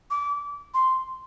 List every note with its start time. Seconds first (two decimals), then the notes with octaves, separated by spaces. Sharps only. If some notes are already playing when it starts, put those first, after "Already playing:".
0.10 D6
0.74 C6